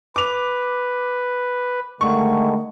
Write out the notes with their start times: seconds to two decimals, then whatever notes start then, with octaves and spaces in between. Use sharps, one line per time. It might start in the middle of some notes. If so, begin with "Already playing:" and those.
0.16 B4 D6 F7
2.01 D3 D#3 G#3 A3 C#6